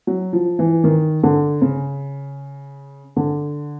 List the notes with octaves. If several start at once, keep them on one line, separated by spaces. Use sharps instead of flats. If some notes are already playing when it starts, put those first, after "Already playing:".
F#3
F3
E3
D#3
D3
C#3
D3